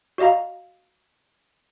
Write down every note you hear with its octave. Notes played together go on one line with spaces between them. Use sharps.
F#4 D5 D#5 F5 A#5